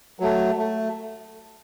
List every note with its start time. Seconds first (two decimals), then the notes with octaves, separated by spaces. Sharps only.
0.20 F#3 A3
0.58 A3